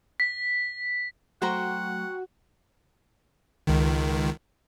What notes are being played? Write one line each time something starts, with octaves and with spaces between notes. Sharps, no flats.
B6
F#3 A3 F#4 C5 F#5 G5 A#5
C#2 D#3